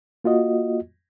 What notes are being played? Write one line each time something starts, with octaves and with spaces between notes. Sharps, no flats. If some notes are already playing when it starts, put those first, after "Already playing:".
A#3 F4 F#4 D#5